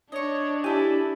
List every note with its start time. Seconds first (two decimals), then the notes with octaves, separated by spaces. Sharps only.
0.12 D4 C#5 D#5 C#6
0.64 E4 G4 A4 G#5